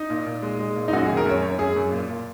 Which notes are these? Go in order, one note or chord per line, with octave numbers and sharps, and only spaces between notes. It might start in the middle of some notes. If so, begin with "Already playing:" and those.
Already playing: D#4
A#2
A#2
G#3
G#3
A#2
D#4
F#2 F#4
D#3 G#4
A#4
F#2 C#5
F#2 C#5
F#2 G#4
F#2
A#2
A#2